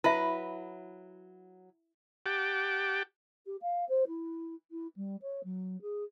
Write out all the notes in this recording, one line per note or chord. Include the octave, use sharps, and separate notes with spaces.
F#3 E4 B4 E5
G4 F#5 G5 A5 D6
G4
F5
C5
E4
E4
G3
C#5
F#3
G#4